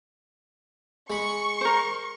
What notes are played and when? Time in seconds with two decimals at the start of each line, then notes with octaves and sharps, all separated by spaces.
1.10 G#3 B5 C#6
1.61 A#4 C5